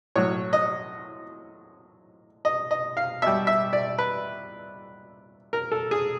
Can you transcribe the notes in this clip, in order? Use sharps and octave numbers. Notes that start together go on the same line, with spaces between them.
A2 F#3 C#5
D#5
D#5
D#5
F5
B2 G3 E5
E5
D5
B4
A#4
A4
G#4